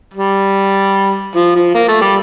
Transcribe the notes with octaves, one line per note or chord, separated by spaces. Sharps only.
G3
F3
F3
A#3
A3
G3